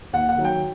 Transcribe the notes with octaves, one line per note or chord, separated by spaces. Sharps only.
D#2 F#5
F#5
D#3 F#3
G5